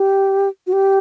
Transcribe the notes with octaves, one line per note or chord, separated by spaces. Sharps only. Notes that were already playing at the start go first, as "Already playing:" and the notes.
Already playing: G4
F#4
G4